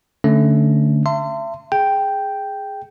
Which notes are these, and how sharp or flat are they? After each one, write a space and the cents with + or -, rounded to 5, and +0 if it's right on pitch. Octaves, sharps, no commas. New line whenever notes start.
D3 -5 A3 +0 C#4 +0
E5 +35 A5 +45 C6 -20
G#4 +0 G5 +0